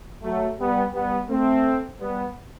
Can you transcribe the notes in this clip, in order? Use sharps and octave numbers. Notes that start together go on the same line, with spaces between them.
F#3 A3
G3 B3
G3 B3
A3 C4
G3 B3